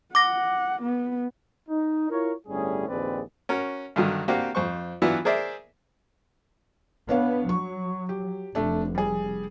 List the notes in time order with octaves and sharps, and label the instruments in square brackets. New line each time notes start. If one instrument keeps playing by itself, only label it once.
[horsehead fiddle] F#5 [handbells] D6 A#6
[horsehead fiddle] B3
[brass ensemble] D#4
E4 F4 A#4 C#5
G1 A2 G3 C#4 G#4
A#1 D#2 C4 G#4 B4 D5
[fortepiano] C#4 F#4 A#4
G2 D3 D#3 F#3
A#3 C4 D4 F#4 G4
F2 C5 C#6
E3 F#3 B3 D4 E4 F4
G#4 A#4 C5 D5 E5
[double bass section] B3 [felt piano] D4 C#5 F5
[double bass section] F#3 [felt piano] C#6
[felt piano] G4
[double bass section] F1 [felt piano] A3 D4
[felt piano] G3 G#4